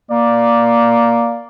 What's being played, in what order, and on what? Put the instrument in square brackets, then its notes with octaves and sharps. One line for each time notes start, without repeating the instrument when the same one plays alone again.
[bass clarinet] A#3 [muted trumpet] D5